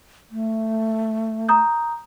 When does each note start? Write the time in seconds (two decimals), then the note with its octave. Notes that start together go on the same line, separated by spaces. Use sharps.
0.31 A3
1.49 A#5 D#6 G6